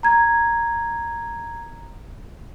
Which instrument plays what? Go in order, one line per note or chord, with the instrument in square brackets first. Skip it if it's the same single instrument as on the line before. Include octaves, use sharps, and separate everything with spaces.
[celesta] A#5 G#6